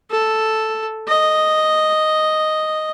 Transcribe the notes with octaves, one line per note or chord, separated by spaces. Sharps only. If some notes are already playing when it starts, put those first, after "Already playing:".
A4
D#5